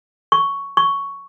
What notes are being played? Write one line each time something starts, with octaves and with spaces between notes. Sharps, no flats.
C#6
C#6